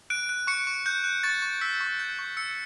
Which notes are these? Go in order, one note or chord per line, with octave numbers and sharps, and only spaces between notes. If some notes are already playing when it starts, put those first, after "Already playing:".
F#6 D7
F#6
C#6 C#7
C#6
F#6 G6
F#6
C#6 A6
C#6
E6 B6
C#6
G6
C#6
E6 C#7